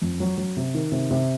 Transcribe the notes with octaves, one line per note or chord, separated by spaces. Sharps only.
F2
F#3
F#3
C3
D#3
C3
C3